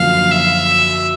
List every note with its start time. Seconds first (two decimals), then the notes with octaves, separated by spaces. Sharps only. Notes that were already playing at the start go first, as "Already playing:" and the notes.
Already playing: F#2 D3 F3 A#3 F5
0.31 E5